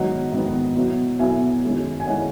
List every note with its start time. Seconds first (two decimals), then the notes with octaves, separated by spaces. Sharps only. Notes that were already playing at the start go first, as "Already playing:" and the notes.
Already playing: G#2 D#3 F#3 B3 D#5 F#5
0.32 G#2 D#3 F#3 B3
0.76 B2 F#3 B3 E4
1.19 B2 F#3 B3 E4 E5 G#5
1.64 F#2 D#3 G#3 C#4 E4
2.00 G#5
2.07 D#3 G#3 C#4 E4 D#5 F#5